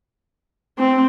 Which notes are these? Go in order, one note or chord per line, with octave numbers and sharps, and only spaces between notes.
C4